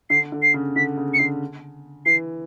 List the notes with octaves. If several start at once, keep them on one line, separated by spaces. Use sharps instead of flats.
D3 C7
D3
C7
C#3
D3 B6
C#3
C#7
D3 C7
E3 C7